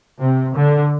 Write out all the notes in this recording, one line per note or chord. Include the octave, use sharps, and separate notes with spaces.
C3
D3